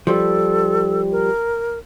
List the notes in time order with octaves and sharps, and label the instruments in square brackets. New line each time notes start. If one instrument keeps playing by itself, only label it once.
[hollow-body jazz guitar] F3 G3 [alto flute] A4
[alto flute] A#4